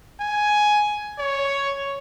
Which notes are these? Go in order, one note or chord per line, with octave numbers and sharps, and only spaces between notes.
G#5
C#5